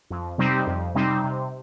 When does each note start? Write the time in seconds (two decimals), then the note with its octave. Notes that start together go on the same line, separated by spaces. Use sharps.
0.10 F2
0.38 C3 G3 C4 D#4
0.67 F2
0.95 C3 G3 C4 D#4
1.24 C3